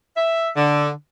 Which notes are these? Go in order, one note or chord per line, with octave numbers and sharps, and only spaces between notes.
E5
D3